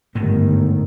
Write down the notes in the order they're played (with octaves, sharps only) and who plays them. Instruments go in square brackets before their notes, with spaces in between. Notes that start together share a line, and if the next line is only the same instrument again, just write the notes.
[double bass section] G1 D#3 [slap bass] G#2 A3 A#3